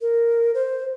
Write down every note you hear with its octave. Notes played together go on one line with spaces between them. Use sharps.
A#4
C5